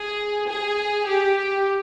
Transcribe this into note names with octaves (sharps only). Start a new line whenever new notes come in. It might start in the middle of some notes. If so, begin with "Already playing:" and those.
Already playing: G#4
G#4
G4